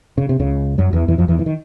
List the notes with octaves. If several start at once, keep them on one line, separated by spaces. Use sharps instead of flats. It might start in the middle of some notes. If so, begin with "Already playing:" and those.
C#3
C3
C#2 C#3
F#2 F#3
E2 E3
E2 E3
F2 F3
E2 E3
E3
D#3